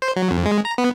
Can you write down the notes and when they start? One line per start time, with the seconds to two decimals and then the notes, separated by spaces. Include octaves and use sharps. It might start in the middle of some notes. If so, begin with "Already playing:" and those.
0.02 C5
0.16 F#3
0.31 F2
0.45 G#3
0.65 A#5
0.78 B3